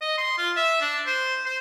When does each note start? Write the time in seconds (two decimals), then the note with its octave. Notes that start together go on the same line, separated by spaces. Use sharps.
0.01 D#5
0.18 C6
0.37 F4
0.57 E5
0.81 D4
1.06 C5
1.46 C5